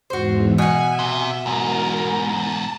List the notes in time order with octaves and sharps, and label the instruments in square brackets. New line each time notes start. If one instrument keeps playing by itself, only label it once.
[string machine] E2 G#2 E3 [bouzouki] F#4 C5
[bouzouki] B2 F#5 [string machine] E5 [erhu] G#5
[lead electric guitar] C3
[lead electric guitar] E2 G#2 [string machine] A#4 [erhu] A#5
[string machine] A5